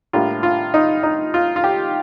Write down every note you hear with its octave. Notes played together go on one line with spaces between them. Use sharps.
A2 G3 A#3 D4 F4
F4
D#4
D#4
F4
F4
G4